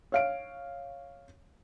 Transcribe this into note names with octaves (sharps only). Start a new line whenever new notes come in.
C#5 F5 D7